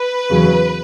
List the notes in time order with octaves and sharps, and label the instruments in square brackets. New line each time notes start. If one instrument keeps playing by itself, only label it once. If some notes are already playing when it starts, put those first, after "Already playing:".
Already playing: [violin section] B4
[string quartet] E2 C#3 F#3